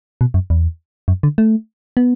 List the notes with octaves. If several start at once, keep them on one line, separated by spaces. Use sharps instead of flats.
B2
F#2
E2
F#2
D3
A3
B3